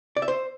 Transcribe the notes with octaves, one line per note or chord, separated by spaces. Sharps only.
D5
E5
C5